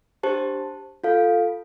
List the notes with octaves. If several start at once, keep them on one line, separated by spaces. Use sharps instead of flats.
D4 G4 C5 A5
F4 A4 F5